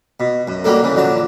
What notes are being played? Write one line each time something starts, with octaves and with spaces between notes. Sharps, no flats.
B2
F#2
F#3 G3 A#3 D4 A4
C#3 E3
A#1 D3 F#3 A5